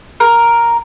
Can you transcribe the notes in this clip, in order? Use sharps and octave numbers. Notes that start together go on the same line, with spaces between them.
A#4